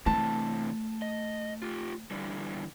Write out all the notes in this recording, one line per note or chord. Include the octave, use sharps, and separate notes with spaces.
C3 E3 A3 A5
D#5
F4 G4
D3 E3 G3